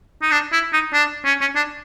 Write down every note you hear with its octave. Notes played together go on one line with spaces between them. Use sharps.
D#4
D4
E4
D#4
D4
C#4
C#4
D4